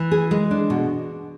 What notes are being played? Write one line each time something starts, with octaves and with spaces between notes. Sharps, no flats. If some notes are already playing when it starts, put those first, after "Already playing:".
Already playing: E3
G#4
G#3
D4
B2